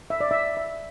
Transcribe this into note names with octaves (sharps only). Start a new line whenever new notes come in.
E5
D5
E5
E5